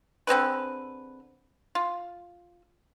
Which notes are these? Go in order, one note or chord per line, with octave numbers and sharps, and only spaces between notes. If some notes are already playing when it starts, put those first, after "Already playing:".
D3 C4 G#4 B4
F4